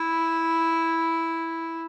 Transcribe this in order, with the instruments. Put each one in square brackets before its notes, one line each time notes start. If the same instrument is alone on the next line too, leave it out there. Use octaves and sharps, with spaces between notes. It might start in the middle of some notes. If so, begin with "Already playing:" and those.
Already playing: [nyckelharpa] E4